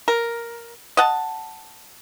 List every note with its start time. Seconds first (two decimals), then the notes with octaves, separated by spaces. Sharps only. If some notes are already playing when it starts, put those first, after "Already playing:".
0.08 A#4
0.97 D#5 F#5 A5